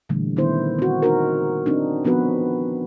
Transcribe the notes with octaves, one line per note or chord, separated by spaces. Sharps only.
A#2 D3 E3 G3 A3
D#3 B3 E4 C5
C4 F#4
D#4 F#4 A#4
C4 D4 D#4
F3 B3 C4 F#4 B4